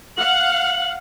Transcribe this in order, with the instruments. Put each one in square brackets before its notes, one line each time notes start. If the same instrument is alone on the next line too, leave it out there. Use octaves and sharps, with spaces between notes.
[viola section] F5 F#5 [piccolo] F#7